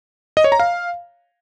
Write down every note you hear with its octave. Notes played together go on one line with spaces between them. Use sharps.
D#5
C#5
A#5
F5